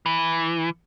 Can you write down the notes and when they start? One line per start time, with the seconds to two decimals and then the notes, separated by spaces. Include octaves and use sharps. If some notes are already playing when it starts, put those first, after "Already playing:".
0.06 E3